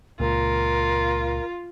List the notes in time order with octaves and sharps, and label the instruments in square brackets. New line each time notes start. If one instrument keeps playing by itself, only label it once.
[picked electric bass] C#2 A#2 [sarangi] F4 [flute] A#4